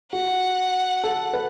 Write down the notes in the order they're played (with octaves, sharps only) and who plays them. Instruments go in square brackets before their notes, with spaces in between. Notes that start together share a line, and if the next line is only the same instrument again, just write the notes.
[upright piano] F#4 [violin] F#5
[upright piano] A4
B4